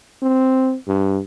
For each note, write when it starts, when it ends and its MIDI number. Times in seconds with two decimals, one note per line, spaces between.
0.23 0.76 60
0.88 1.21 43